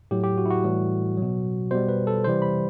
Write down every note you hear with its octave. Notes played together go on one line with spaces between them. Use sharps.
A2 F#3 G4
G4
F#4
E4
F#4
A2 E3 G3
B2 F#3
B2 G3 C5
B4
A4
C3 E3 G3 C5
B5